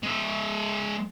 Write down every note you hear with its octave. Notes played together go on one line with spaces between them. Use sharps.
G#3 E5